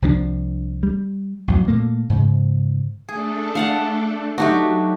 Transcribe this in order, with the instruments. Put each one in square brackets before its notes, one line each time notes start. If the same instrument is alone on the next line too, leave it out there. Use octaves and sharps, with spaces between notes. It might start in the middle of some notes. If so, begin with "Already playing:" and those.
[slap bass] C2 F3 C#4 D4
G3
A1 F2 F#3
A#2 A3 A#3
G#2 C#3
[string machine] A3 D4 A4 [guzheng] G#4
[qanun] F5 F#5 A5
[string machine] F#3 [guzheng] A3 D4 F#4 [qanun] D#4 G4